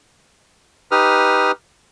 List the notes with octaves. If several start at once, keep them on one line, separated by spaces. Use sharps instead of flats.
D#4 G4 B4 D#6 F6